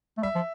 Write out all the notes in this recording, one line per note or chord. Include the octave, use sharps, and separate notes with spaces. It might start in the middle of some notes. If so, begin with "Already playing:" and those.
A3
G3 E5
F3